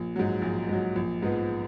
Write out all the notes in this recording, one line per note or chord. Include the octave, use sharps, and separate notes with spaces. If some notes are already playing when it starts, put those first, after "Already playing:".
Already playing: A#1
G#2 F#3
A#1
G#2 F#3
A#1
G#2 F3 B3